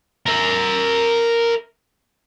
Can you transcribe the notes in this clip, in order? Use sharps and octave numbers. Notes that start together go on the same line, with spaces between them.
A#4 E5